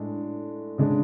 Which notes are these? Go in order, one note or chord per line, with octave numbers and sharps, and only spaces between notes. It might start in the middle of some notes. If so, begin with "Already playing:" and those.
Already playing: A2 G#3 D4
C#3 G#3 D4